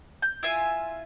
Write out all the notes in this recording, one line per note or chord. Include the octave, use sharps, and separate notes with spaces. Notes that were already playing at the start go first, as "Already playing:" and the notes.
G6
E4 F4 E5 G#5